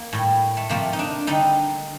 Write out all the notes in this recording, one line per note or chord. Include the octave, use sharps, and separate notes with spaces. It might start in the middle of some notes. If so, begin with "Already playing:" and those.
Already playing: A#3
A2 G3
A3
C3 F3 A3 A#3
D#4
D4
D3 G3 D#4